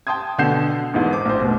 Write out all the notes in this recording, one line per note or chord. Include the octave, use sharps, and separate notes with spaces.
G5 A5 C6 D#6 G#6
B2 D3 F#5 G6 C7 E7
G#1 E2 G#2
C5 D6
A#1 C5
F1 B2